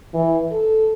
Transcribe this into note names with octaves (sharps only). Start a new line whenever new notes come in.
E3
A4